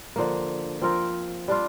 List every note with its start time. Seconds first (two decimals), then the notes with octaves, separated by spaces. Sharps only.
0.16 D3 F3 A#3
0.82 F3 C4 F4 A#4
1.48 G3 D4 F4